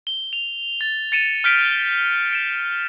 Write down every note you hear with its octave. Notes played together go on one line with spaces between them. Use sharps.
G7
F7
A6
A6 C#7 D#7 E7
F6 G6 B6 D7
D7 E7